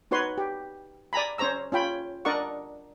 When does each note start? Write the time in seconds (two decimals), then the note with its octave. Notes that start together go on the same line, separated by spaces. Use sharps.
0.11 D#4 F#4 B4 C#5 C6
0.38 G4
1.13 D5 G#5 A#5 B5
1.38 C#4 C5 C#5 A#5 E6
1.72 C#4 F4 G5 B5
2.25 D4 A#4 D5 D#5 F#5 C#6